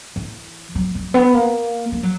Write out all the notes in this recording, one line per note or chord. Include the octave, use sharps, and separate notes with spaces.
E3
F#3
F#3
B3
A#3
G#3
F#3